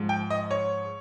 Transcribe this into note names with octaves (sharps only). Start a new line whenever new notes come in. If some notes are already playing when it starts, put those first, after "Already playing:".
Already playing: G#2 F3
G5
D#5
C#5